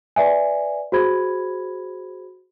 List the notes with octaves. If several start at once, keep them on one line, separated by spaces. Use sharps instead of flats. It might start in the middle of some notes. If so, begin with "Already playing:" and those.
B4 D5 E5 G#5
F#4 G#4 C5 B5 G#6